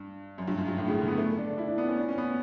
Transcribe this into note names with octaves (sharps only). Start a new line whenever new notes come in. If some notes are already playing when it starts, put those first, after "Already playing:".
Already playing: G2
F#2
G2
F#2
G2
A2
C#3
D3
B3
A3
D4
E4
D4
B3
C#4
D4
C#4
B3